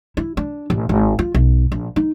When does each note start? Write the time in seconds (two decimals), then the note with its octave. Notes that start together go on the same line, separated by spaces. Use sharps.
0.17 E4
0.37 D4
0.70 A1
0.89 G#1
1.19 F4
1.34 B1
1.72 A#1
1.96 D#4